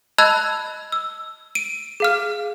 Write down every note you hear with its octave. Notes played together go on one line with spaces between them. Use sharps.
D#5 A5 B5 E6 F#6 G#6
E6
D7 D#7
G#4 F5 F6